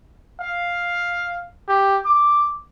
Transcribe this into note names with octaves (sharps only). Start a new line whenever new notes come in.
F5
G4
D6